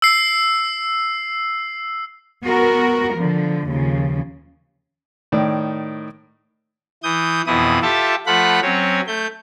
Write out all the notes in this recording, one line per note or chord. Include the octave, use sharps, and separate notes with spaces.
E6 C7
B3 F#4 A#4
D3 F3
D#2 C#3 F3
A2 D#3 D5
E3 D#6 G6
F2 B2 E3 E4 D#6
F4 G4 A4 E5 A5
F3 A3 F4 F#5 B5 F#6
F#3 C4 C#4 C#5
A3 G6